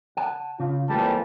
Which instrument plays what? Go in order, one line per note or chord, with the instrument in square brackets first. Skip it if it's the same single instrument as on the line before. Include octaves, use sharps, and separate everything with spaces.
[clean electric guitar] F#5 A5
[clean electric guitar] C#3 [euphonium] F4
[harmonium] F2 E3 F3 [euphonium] A#2 [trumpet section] G3 A5 [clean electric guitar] G#3